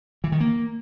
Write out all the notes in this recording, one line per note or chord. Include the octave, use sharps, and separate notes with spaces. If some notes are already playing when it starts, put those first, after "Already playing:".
E3
D#3
A#3